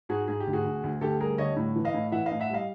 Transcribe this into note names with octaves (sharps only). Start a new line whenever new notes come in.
G#2 F#4 G#4
G#2 G#4
G4
D2
F#4 G#4
D2
D2
D2 G4 A4
G3 G#4 A#4
D3 C#5 D#5
A2
E3
D#5 F5
A2
E3 E5 F#5
D#5 F5
A2
E5 F#5
G3 D#5 F5